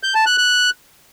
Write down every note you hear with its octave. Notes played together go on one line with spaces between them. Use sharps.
G6
A5
F#6
F#6